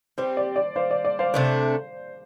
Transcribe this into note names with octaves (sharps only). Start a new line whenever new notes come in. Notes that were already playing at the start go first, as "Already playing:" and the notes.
G3 C4 G4 C5
D5
D5
C5 F5
D5
D5
C5 F5
C3 A3 D4 C5